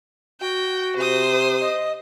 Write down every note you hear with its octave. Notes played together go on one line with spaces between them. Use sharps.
F#4 G5
C3 C5 D#6
D#5